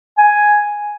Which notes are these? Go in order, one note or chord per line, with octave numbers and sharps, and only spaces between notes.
G#5